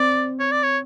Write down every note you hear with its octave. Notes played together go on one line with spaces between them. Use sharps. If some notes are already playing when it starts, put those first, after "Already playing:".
Already playing: C4 D5
C#5
D5
C#5